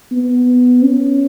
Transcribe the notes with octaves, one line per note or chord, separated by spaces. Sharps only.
B3
C#4